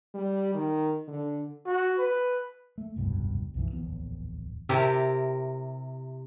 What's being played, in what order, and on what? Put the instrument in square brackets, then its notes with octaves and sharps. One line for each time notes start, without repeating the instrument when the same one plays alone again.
[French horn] G3
D#3
D3
[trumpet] F#4
B4
[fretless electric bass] A3
F1 C#2 G2 B2
B1 F#2 E3
D1 A#1 E2 B3
[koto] C3 E4 G4 A#4 A5